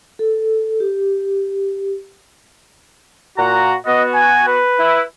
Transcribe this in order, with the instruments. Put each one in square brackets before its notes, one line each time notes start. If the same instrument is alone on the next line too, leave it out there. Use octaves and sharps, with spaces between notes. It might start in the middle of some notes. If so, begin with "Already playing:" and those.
[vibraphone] A4
G4
[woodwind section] A#2 F#5 A#5 [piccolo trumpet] F#4
[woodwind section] B3 F#4 [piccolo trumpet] D#5
[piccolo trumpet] G#5
B4
[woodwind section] E4